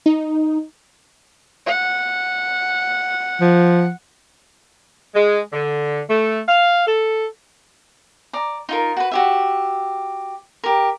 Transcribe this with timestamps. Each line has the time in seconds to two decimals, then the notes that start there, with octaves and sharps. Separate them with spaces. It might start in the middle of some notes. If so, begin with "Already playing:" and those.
0.06 D#4
1.66 F#5
3.41 F3
5.15 G#3
5.53 D3
6.09 A3
6.47 F5
6.86 A4
8.33 D5 A#5
8.69 D#4 F4 A#4
8.97 F#4 B4
9.11 F#4 G4 E5
10.64 G4 A#4